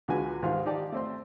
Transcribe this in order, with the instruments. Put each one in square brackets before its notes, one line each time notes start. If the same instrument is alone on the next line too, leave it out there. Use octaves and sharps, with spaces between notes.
[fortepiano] C#2 D3 G#3 F#4 B4 G#5
G#2 D#3 G3 F4 F5 C6
D#4 G4 D5 A5
A3 C4 C6